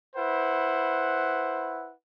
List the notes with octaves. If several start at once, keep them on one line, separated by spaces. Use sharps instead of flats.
E4 B4 C5 F#5